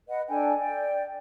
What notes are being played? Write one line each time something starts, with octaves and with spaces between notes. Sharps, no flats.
B4 D#5 F#5
D4 A4 G5 G#5
D5 G5